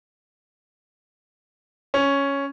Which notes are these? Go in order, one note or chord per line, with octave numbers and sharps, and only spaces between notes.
C#4